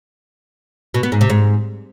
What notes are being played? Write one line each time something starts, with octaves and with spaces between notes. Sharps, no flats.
B2
B3
G#2
C3
G#2